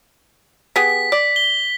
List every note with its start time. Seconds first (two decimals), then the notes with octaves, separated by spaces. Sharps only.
0.76 B3 G4 G#4 B6
1.12 D5
1.36 G7